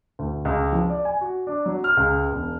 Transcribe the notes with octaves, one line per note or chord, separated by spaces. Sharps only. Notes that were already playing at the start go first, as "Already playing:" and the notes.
D2
C#2
F3
D5
G#5
F#4
D4
F#3
F6
C#2
E1